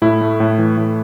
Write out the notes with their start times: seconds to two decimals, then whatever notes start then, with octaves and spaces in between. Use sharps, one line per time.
0.02 A2 E4
0.21 A3
0.40 A2
0.59 E3
0.77 A2